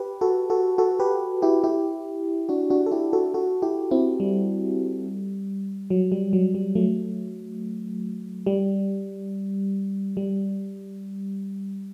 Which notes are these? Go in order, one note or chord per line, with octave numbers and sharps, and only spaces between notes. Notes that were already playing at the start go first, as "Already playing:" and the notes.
Already playing: G4 B4
F#4 A4
F#4 A4
F#4 A4
G4 B4
E4 G4
E4 G4
D4 F#4
D4 F#4
A4
E4 G4
F#4 A4
F#4 A4
E4 G4
C4 E4
G3
F#3
G3
F#3
G3
F#3 A3
G3
G3